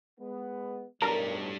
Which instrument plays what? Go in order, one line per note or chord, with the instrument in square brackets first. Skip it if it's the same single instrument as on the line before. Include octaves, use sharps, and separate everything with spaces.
[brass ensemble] G#3 B3
[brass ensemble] B1 A2 [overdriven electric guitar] G3 D4 [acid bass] A#4 [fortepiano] A#5